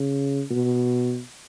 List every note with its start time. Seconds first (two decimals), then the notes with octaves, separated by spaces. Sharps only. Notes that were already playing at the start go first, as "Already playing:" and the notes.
Already playing: C#3
0.50 B2